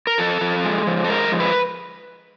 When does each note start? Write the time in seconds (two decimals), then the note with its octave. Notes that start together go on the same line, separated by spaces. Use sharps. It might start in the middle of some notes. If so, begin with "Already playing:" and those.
0.07 A#4
0.18 F3 A4
0.41 F3
0.64 G#3
0.87 F3
1.04 A4
1.09 G#3 A#4
1.32 F3
1.40 B4